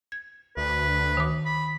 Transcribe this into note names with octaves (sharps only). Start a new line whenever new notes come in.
G#6
D2 B4
D#3 D6
B5